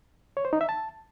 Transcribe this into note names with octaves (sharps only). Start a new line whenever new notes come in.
C#5
C5
D#4
E5
A5